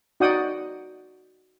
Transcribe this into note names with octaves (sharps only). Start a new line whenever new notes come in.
D#4 F#4 D5 F#5 G5 D#6